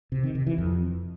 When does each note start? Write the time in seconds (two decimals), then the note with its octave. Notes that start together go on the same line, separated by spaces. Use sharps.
0.12 C3
0.23 D#3
0.35 C3
0.47 E3
0.58 F2